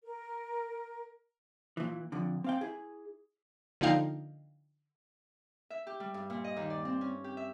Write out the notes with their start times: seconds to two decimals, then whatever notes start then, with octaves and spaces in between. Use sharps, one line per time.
0.04 A#4
1.77 A#2 E3
2.12 F2 D3
2.44 C4 F5 G5
2.61 E4 G#4
3.81 D3 F3 A#3 D#4 F5 G5
5.70 E5
5.87 G4
6.00 G3
6.14 G2
6.30 A#2
6.44 D#5
6.56 D#2
6.70 D5
6.85 C4
7.01 C#4
7.24 G4
7.37 E5